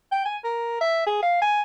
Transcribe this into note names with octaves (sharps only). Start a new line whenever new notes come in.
G5
G#5
A#4
E5
G#4
F5
G#5